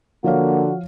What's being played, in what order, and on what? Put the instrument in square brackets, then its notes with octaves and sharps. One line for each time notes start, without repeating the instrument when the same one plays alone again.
[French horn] D3 [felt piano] F3 C#5 F5 [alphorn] A#3 [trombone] F#4